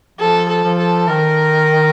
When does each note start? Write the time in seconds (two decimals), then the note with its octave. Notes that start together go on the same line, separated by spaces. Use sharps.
0.19 F3 A4
0.48 A4
0.64 F3
0.78 A4
1.08 D#3 A#4